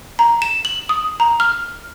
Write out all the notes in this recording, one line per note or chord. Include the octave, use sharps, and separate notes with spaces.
A#5
E7
F#7
D#6
A#5
F6